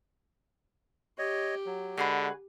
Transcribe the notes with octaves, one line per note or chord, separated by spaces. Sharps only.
G4 C#5 D#5
F#3
D3 G#3 F#4 G#4 B4